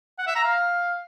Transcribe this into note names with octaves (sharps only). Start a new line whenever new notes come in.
F#5
E5
A#5
F5